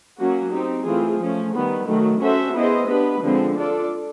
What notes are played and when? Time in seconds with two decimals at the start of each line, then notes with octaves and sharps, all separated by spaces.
0.18 F#3 A#3 C#4 F#4
0.52 C4 D#4 G4
0.85 E3 A3 C4 F4 G#4
1.19 F3 A3 C#4
1.53 D#3 G3 B3
1.86 D#3 F#3 A3
2.20 C#4 F#4 A4 C5 E5
2.53 B3 E4 G#4 C5 D#5
2.87 B3 D4 G4 B4
3.21 D3 F3 G#3 C4
3.55 D4 F4 A4 D5